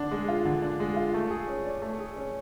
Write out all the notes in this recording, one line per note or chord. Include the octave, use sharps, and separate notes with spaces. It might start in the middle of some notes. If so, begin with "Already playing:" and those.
Already playing: D3 D4
G#3
F4
D3
D4
G#3
F4
A3
G#4
C#4
D5
A3
G#4
C#4